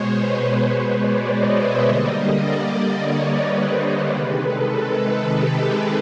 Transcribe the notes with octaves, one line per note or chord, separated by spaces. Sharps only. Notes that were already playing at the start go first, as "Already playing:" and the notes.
Already playing: B2 G#3 C5 C#5
B4
B4
C5
D5
D#5
E5
D3 G3 A#3 D#5
D5
C#5
B4
C5
C#5
C3 D#3 G#3 B4
A4
A4
G4
G#4